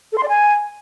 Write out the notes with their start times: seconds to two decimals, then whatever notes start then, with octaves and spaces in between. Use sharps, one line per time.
0.12 A4
0.18 C6
0.23 D5
0.29 G#5